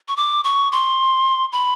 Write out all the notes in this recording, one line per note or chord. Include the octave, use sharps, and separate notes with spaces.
C#6
D6
C#6
C6
B5